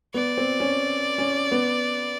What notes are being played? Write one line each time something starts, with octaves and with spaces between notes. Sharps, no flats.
B3 D5
C4
C#4
C#4
B3